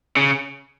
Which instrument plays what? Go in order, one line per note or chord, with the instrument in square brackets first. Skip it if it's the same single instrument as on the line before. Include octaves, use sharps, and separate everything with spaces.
[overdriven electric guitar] C#3